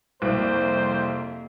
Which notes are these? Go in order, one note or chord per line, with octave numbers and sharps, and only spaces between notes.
C2 F2 C3 A#3 C5